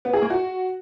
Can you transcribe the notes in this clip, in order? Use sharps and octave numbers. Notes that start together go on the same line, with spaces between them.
B3
G#4
A#3
F#4